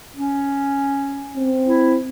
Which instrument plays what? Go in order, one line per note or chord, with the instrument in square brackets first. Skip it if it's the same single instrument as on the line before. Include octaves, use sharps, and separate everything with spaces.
[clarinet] C#4
[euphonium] C4
[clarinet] E4